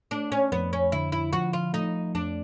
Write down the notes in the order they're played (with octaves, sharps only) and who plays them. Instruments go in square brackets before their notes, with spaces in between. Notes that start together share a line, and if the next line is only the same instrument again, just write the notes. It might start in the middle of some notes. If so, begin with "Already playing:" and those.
[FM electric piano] A3 [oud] D4
[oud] C#4
[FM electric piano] F2 [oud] B3
[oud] C#4
[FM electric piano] D3 [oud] E4
[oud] E4
[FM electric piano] F3 [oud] F#4
[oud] F4
[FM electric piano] A3 [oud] D#4
[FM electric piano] F2 [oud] D4